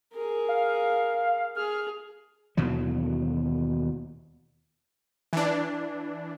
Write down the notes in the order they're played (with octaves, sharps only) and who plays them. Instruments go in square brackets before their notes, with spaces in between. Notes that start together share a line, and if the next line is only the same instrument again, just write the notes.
[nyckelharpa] G#4 A#4
[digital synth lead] F5
[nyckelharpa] G#4 [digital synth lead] F6
[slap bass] D#2 B2 E3 F#3
[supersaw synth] E3 D4